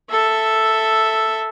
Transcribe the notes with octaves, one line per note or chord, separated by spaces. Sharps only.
A4 E5